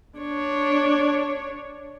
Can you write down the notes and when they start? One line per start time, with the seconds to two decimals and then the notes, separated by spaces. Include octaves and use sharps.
0.18 D4 C#5